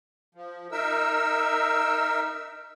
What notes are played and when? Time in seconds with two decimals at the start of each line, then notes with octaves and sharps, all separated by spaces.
0.35 F3
0.72 D#4 A#4 E5 E6